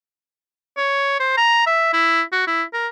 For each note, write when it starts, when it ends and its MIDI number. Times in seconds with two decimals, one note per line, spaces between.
0.77 1.19 73
1.20 1.37 72
1.37 1.62 82
1.66 1.90 76
1.93 2.22 64
2.32 2.43 66
2.47 2.63 64
2.74 2.88 70